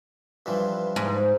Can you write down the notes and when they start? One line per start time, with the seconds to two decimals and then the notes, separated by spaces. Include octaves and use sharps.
0.46 G2 E3 F3
0.96 G#2